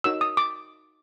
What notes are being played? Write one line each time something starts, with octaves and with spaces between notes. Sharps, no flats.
D#4 F#4 A#4 C#5 E6
D#6
D6